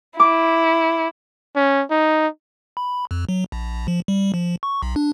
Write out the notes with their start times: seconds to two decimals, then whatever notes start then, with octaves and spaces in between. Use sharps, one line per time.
0.20 E4 D6
1.56 C#4
1.91 D#4
2.77 B5
3.11 F2
3.29 F#3
3.52 A#1
3.74 A#1
3.88 F3
4.08 G3
4.34 F3
4.63 C#6
4.82 B1
4.96 D4